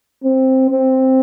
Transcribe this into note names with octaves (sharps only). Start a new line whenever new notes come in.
C4
C4